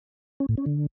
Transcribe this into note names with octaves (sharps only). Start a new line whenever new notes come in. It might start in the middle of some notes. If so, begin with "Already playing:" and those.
C#4
A2
C#4
D3